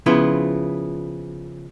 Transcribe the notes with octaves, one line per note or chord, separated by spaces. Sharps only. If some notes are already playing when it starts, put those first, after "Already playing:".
C#3 F3 B3 E4 F4